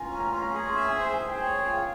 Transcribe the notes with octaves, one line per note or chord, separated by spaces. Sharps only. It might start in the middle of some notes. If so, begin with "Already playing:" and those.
Already playing: F4 G#5 A#5
C#4
A#5
C#4 C6
A#5
G#4 C#6
C6
E5
G#5
C5 G#5
G#5
G#4
G5
C#5
G5
F4
F5